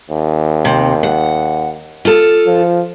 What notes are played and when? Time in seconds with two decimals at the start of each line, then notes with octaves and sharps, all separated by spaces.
0.10 D#2
0.65 C3
1.03 F#5
2.05 F4 A4
2.46 F3